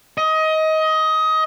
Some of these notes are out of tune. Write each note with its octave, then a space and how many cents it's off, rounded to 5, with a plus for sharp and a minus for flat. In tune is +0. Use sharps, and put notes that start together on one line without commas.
D#5 +20